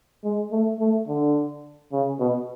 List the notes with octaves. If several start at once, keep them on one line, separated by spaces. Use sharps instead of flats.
G#3
A3
A3
D3
C#3
B2